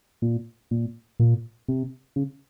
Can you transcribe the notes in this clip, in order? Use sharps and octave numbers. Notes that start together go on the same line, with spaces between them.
A#2
A#2
A#2
C3
C#3